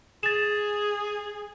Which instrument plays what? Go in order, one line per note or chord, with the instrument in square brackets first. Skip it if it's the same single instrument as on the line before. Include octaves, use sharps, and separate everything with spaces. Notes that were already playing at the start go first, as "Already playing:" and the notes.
[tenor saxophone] G#4 [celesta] A6 E7